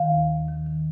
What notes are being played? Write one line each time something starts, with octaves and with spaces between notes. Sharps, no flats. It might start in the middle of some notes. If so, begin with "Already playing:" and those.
Already playing: D#3 F5
D#2
D#2
D#3
D#3